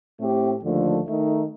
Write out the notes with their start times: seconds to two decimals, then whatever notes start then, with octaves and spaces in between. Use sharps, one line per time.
0.19 A2 A3 C4 G4
0.62 D#2 D3 F3 A3
1.06 D#3 A3 D#4